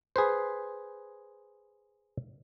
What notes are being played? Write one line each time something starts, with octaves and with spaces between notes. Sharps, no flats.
G#4 B4 C5